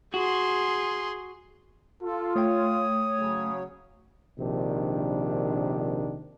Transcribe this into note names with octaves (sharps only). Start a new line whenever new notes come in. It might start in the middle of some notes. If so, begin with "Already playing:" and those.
F#4 G#4 C6
F4 A4
A3 C#5 G5 D#6
C#3 F#3
A#1 C3 D#3 D4